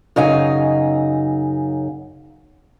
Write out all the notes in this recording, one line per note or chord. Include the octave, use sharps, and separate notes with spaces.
F#2 C#3 D#4 G#5